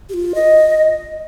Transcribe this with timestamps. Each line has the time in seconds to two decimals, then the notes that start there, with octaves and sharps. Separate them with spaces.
0.09 G4
0.14 F4
0.35 D#5